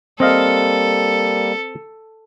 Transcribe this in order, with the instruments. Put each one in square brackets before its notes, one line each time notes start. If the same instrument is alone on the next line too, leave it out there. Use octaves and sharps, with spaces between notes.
[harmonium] G3 A#3 [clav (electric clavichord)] C4 D#5 F5 [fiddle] A4